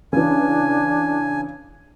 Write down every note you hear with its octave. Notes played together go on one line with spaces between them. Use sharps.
C#3 E3 D4 G#5